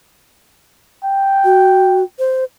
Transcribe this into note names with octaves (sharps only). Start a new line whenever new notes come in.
G5
F#4
C5